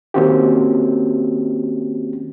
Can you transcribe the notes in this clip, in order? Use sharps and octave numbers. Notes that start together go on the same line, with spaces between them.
D#3 A#3 C4 C#4 F#4 G4